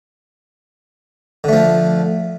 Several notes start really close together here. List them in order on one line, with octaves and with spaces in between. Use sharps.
D3 A3 F3